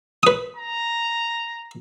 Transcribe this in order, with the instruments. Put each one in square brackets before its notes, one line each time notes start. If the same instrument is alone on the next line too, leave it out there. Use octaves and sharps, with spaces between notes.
[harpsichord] B4 D#6
[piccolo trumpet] A#5